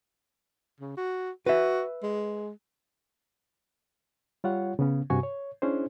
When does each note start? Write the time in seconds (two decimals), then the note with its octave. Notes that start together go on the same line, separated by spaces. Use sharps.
0.81 C#3
0.97 F#4
1.46 F#4 B4 E5
2.03 G#3
4.44 G3 F4 C#5 F#5
4.79 C#3 B3 C#4
5.10 G2 C3 F#4 G#5 C#6
5.23 C#5
5.62 C#4 D4 E4 G#4 C5